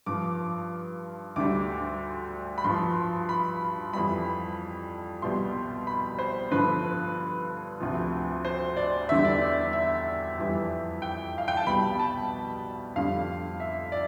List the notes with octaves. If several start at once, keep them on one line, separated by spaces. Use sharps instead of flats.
G2 F3 D6
D2 D3 G3 D6
B5
G2 F3 C6
B5
F2 E3 G3 B5
C2 B2 G3 C6
B5
C5
G2 D3 F3 B4
D2 C3 F3
C5
D5
E2 D3 G3 E5
D5
D5
E5
F2 E3 G3
G5
F5
G5
A5
C2 B2 G3 B5
A5
F2 D3 G3 F5
E5
D5